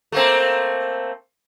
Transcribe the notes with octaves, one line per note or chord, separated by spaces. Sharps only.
A3 A#3 C4